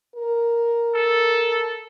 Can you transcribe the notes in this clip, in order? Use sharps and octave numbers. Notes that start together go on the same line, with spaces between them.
A#4
A4